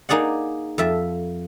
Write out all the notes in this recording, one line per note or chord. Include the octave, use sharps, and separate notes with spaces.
A#3 D#4 G#4 D5 F#5
F2 E5 A5